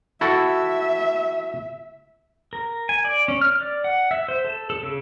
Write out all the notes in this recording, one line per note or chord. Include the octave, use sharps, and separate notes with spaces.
E4 F#4 A4 E5
A#4
G#5
D5
C#4
F6
D5
F#5
E5
C5
A4
A4
C#3